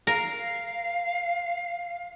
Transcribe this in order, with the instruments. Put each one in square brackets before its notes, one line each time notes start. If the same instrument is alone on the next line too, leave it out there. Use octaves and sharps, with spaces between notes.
[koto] A#4 [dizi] F5